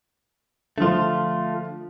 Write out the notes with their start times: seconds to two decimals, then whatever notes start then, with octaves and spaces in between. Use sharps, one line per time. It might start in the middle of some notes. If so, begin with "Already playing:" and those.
0.78 D3 F3 A3 F4